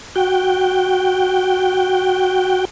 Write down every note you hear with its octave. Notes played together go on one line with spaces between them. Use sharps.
F#4 G5